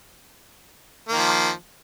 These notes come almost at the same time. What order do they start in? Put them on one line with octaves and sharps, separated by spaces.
A#3 D#3 F3